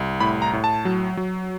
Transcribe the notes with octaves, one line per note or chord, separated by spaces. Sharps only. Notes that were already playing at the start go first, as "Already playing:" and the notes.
Already playing: C2
A2 B5
A#5
A2
A5
F#3
F#3